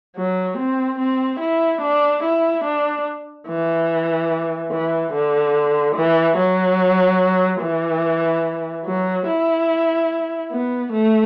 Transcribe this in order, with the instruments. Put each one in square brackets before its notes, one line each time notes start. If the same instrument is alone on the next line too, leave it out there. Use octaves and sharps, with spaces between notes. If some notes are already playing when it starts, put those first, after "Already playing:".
[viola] F#3
C4
C4
E4
D4
E4
D4
E3
E3
D3
E3
F#3
E3
F#3
E4
B3
A3